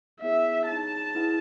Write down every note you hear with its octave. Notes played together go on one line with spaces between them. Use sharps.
B3 E4 G#4 C#5 E5
D#4 G#4 C#5 A5
E4 G#4 B4 F#5